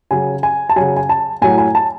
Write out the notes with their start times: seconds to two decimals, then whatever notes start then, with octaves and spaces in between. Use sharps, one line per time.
0.11 C#3 F#3 G#5
0.43 G#5
0.69 A5
0.76 C#3 F#3 G#5
0.97 G#5
1.09 A5
1.42 A2 F#3 G#5
1.58 G#5
1.75 A5